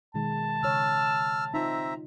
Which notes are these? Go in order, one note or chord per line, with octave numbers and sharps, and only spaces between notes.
B2 D#3 G#3 A5
C#3 C#5 E6 F6
C4 D#4 F4 E5 A#5